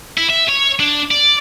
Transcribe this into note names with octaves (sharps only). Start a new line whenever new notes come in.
E4
E5
C#5
D4
D5